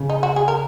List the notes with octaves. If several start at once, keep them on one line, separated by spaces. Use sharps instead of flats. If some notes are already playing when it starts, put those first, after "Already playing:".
Already playing: C#3
D#4
F#4
G#4
A#4